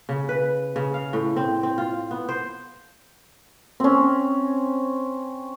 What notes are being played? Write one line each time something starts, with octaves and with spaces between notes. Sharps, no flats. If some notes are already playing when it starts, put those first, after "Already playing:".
C#3
B4
C#3
F5
A2
C4
C4
F4
B3
C5
C4 C#4